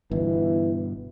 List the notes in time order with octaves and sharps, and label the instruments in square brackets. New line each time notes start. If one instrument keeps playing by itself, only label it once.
[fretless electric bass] G1 B2 [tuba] E3